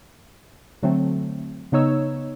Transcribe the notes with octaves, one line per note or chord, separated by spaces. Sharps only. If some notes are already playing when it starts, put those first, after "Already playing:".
D3 F#3 A3 C4
C#3 B3 D#4 C#5 E6